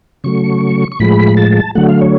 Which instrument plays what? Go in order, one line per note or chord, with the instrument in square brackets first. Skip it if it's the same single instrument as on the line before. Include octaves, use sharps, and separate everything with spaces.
[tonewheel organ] C#3 F#3 A3 C#6
C#6
A2 F3 G#3 B5
A5
D3 F#3 A3 F#5
F5
C#5